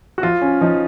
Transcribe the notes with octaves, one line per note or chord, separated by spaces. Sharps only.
F#4
F3 F4
C#4
F3 D#4